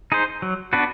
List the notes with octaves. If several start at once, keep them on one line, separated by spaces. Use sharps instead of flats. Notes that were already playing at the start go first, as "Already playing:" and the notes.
D#4 G#4 C5
F#3
B3 D4 F#4 B4